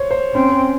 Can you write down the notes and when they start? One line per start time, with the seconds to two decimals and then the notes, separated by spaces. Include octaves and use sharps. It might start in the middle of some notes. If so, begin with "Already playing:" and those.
Already playing: C5 C#5
0.11 C5
0.34 C4 C#4